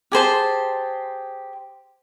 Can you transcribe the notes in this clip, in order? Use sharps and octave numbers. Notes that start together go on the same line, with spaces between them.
G4 G#4 C5 A5